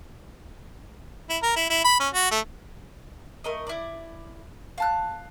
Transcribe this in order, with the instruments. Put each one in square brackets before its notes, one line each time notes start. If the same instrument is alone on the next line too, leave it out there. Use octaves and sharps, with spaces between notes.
[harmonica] E4
A#4
E4
E4
B5
C#4
F#4
A3
[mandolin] A3 A#4 D#5
E4 D5
F5 A5 F#6